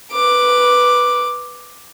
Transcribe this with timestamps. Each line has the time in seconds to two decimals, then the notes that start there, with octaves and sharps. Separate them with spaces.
0.12 B4 D6